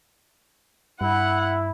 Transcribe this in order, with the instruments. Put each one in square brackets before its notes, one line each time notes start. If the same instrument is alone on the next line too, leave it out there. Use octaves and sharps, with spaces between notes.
[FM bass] G2 [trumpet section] E4 [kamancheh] F#5